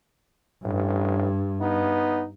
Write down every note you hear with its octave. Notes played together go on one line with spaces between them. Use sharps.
A1 G2
B3 D#4